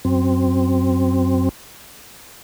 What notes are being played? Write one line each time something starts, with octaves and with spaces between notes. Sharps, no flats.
F#2 C4